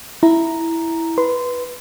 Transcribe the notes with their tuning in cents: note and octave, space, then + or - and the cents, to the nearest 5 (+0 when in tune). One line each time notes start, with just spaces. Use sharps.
E4 +0 A#5 +0
B4 -5 C6 -20